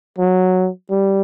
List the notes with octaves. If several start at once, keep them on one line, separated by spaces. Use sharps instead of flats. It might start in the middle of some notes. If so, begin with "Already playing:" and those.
F#3
G3